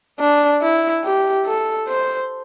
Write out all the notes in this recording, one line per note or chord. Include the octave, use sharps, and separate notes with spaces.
D4
E4
G4
A4
C5